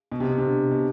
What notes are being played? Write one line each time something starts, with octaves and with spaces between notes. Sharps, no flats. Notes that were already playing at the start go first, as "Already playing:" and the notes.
B2
C3
B2
C3
D3
B2